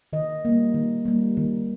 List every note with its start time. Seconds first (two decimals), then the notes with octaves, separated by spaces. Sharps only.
0.13 D#3 D#5
0.45 G3 A#3
0.75 D#3
1.05 G3 A#3
1.37 D#3